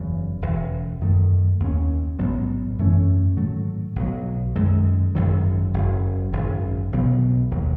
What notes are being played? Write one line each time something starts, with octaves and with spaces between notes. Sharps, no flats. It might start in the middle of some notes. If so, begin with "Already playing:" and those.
Already playing: F#1 E2 C#3 F#3
E1 E2 C#3
F#2 D#3 A3
D#2 D#3 A3 C#4
A1 G#2 F#3 B3
F#2 E3 A3 C#4
G#2 D#3 F#3 A3
B1 B2 F#3
F#2 D#3 G#3
G#1 F#2 D#3 F#3
F#1 F#2 C#3
G#1 F#2 C#3
B1 B2 F#3 B3
E1 D#2 D#3 F#3